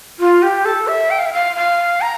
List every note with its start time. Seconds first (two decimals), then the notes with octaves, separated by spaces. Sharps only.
0.20 F4
0.42 G4
0.65 A4
0.88 E5
1.10 G5
1.19 F5
1.26 E5
1.33 F5
1.56 F5
2.01 A#5